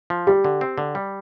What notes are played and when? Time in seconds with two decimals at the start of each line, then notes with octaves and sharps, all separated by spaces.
0.10 F3
0.27 G3 G4
0.45 D3
0.61 C4
0.78 D3
0.95 G3